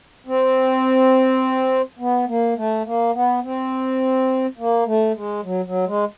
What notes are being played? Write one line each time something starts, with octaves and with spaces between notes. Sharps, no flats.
C4
B3
A#3
A3
A#3
B3
C4
A#3
A3
G#3
F#3
F#3
G#3